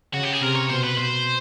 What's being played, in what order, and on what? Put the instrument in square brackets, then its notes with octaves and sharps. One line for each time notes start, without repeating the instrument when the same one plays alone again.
[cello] C#3 [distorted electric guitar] F#4
[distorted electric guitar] G4
G#4
[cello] C3 [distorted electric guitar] A#4
[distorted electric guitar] C#5
[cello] B2 [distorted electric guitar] C5
[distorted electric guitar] B4
[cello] B2 [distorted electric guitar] C5